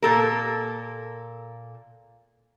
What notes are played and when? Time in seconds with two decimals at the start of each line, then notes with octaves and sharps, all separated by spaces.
0.02 A#2 A4 A#4